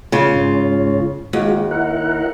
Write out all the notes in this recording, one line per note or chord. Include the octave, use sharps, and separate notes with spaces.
C#3 F4
G#2 C#4
D#2 G#3 F4 F#4
E4 A#4 F#5